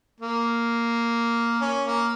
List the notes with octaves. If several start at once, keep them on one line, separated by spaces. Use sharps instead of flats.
A#3
C#4
A#3